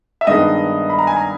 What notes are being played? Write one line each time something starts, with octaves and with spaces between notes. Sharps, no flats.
E5
G2 D#3 G#3 B3 D#5
B5
A#5
G#5
A#5